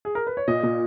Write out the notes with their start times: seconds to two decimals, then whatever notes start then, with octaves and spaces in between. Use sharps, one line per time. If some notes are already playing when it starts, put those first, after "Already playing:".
0.05 G#4
0.15 A#4
0.27 B4
0.37 C#5
0.48 A#2 D#5
0.63 A#2